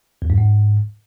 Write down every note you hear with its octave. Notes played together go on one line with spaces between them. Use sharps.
E2
G2
G#2